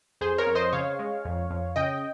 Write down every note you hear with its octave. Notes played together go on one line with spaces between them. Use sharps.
F2 G#4 C5
A#4 C#5
F2
C5 D#5
C#3 C#5 F5
G#3
F2
F2
C#3 D#5 G5